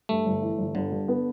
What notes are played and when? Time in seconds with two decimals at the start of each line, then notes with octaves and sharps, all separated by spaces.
0.09 G2 A3
0.26 G1
0.42 E3
0.58 G1
0.75 G1 D3
0.92 G2
1.08 B3